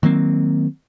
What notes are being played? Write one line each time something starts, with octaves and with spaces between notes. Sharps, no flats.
D#3 F#3 A#3 C4